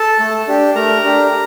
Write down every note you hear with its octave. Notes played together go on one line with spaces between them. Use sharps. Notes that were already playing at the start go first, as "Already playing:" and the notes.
Already playing: A4 A5
A3
D4 G4
A3 A#4 A#5
D4 G4